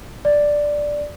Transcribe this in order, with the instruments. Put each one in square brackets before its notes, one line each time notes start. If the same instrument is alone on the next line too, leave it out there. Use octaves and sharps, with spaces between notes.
[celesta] D5